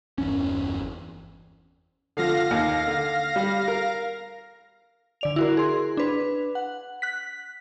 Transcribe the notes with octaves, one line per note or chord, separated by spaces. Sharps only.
G1 E2 C#4
D3 F3 F5 A#6
D#2
D3
G3
A#4
D3 D5 F7
E4 F#4 A#4
G#4 C6
D4 B4
F#5
F#6 B6